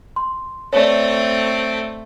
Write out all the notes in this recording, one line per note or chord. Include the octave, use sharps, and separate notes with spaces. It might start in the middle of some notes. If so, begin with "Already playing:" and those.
C6
A3 C4 C#5 D5